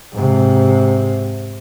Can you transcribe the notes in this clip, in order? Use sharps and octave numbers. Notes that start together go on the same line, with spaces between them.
G#2 C3